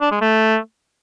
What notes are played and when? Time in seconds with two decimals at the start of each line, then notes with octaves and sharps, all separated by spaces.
0.01 D4
0.11 G#3
0.21 A3